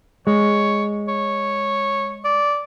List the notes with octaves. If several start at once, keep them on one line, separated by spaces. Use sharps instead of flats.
G#3 C#5
C#5
D5